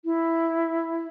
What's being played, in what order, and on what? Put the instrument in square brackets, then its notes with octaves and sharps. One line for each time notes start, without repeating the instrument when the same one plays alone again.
[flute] E4